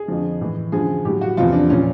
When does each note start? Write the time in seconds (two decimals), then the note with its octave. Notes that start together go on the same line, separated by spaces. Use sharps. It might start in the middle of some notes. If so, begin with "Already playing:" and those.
Already playing: G#4
0.08 F2 D3 F3
0.41 A2 E3
0.72 F#2 D3 F3 G#4
1.05 A2 F#3 G4
1.21 F#4
1.37 E2 C3 F3 F4
1.53 D4
1.70 A#2 F3 C#4